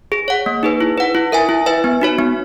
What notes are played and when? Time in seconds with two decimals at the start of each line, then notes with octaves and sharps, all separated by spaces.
0.12 G#4
0.28 C#5 F#5
0.46 A#3
0.63 D#4 G#4 B4
0.81 E4
0.98 B4 F#5
1.15 E4
1.32 A#4 E5 G#5
1.49 E4
1.66 B4 E5 G#5
1.84 B3
2.01 D#4 F#4 C#5
2.19 B3